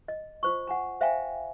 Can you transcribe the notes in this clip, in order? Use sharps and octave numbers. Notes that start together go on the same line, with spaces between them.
D#5
F4 C5 C#6
F#5 G#5 A#5
C5 E5 F5 G5 G#5 A#5